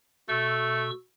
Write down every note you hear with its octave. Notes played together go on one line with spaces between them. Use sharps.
B2 A3 C#6 E6